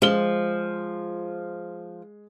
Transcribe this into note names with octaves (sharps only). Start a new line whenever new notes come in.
F3 G#3 G7